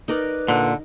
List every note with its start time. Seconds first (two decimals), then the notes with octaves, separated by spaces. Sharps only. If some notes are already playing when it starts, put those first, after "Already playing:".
0.08 D#4 A#4 B4 D5
0.48 A#2 D3